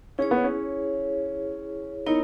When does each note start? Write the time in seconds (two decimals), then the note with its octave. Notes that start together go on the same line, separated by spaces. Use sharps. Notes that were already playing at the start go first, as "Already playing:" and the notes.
0.18 C#4 E4 G#4 C#5
0.31 B3
0.44 C#4
2.06 B3 D#4 E4 A#4 C#5